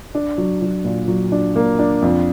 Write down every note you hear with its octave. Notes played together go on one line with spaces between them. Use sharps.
D4
F#3
F#3
A#2
F#3
D4
A#3
D4
F2